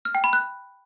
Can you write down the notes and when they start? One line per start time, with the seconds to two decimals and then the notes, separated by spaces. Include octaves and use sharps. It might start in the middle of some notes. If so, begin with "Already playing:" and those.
0.05 F6
0.15 G5
0.24 B5
0.33 F#6